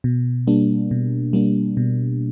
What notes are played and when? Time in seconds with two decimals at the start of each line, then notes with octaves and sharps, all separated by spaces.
0.04 B2
0.47 G3 A#3 D4
0.91 B2
1.33 G3 A#3 D4
1.77 B2